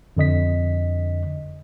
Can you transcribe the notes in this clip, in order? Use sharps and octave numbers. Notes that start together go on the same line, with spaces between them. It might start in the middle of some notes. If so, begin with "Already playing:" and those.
F2 D3 D#5 B6